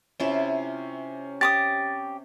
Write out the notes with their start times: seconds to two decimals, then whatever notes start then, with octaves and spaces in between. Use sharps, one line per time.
0.20 C3 C#4 E4 F4
1.41 G4 D6 D#6 A6